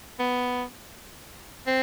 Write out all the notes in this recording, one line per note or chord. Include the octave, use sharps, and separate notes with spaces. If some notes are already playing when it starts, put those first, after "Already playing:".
B3
C4